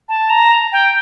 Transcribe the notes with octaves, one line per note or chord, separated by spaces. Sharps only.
A5
A#5
G5